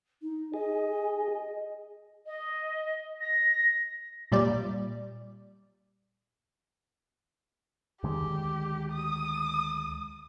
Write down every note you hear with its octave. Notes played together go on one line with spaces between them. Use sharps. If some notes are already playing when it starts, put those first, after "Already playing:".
D#4
G#4 D#5
D#5
A#6
A#2 G3 D5
D2 D#3 G#3 G4
D#6